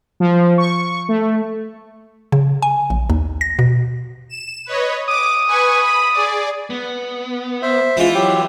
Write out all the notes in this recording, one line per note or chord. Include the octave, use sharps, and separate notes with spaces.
F3
C#6
A3
C#3
G#5
A#1
D#2
A#6
B2
E7
B4 C#5 D#5
D6 D#6
B4 G#5 C#6
B5
G#4 D5
B3
C5 E5
E3 G#3 E4 F4
F#3 G4